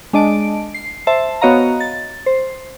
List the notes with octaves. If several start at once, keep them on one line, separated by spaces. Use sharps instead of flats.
G#3 D4 D#5 A5 D7
C7
C5 E5 A5
B3 F#4 C#5 D#5 F5 A#5
A6
C5